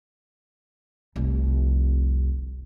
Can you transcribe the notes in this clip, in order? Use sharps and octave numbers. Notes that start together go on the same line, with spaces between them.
F1 C2